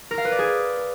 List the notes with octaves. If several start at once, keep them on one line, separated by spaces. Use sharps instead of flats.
A#4
F5
B4
D5
G#4